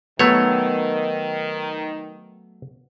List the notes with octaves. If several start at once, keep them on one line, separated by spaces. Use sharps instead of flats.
D#3 F#3 A3 B3 C#5